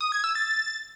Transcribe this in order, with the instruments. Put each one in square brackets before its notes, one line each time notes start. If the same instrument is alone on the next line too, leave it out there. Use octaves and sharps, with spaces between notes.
[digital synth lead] D#6
G#6
E6
A6